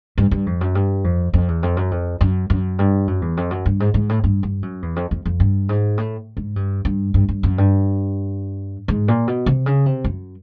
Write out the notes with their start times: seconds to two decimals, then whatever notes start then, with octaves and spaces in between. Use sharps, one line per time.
0.18 G2
0.31 G2
0.46 F2
0.61 F#2
0.75 G2
1.04 F2
1.34 F2
1.48 E2
1.63 F2
1.77 F#2
1.91 F2
2.21 F#2
2.50 F#2
2.79 G2
3.07 F#2
3.22 E2
3.37 F2
3.51 F#2
3.66 G2
3.80 G#2
3.94 G#2
4.09 A2
4.24 G2
4.43 G2
4.63 F#2
4.82 E2
4.96 F2
5.11 F2
5.26 F2
5.40 G2
5.69 G#2
5.98 A2
6.37 G#2
6.56 G2
6.85 G2
7.14 G2
7.29 G2
7.43 F#2
7.58 G2
8.88 G#2
9.08 A#2
9.28 B2
9.46 C3
9.66 C#3
9.86 C3
10.04 F#2